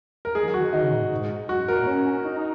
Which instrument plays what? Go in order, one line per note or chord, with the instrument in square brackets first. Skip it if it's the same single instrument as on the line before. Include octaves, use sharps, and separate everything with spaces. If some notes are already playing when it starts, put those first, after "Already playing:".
[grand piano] A#4
[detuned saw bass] G#3 [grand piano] G#4
[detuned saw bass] D#3
F#3
[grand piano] F#4
[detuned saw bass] D#3
[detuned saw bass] D#3 [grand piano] D#4
[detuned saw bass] C#3
A#2
G#2
[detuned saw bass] F#2 [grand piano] F#4
[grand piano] A#4
[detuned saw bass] A#2
C#4
D#4